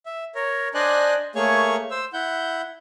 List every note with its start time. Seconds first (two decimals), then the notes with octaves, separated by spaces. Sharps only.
0.06 E5
0.35 A#4 C#5
0.74 D4 C5 D5 D#5 G#5 F#6
1.35 A3 A#3 G#4 C#5 C#6
1.91 C5 E6
2.13 E4 F#5 G6